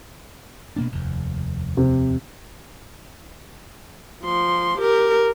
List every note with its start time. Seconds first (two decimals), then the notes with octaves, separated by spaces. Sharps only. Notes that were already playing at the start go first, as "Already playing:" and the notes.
0.76 B2 A#3 D4
0.92 F1 D#2
1.77 C3
4.23 F3 C6
4.78 G4 A#4